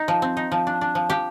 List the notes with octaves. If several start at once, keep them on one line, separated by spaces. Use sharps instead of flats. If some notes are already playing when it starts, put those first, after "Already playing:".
Already playing: D#4
F3
C4
D#4
F3
D4
D4
F3
F3 G4